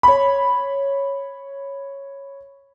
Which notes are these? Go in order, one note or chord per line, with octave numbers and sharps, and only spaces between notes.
C#5 B5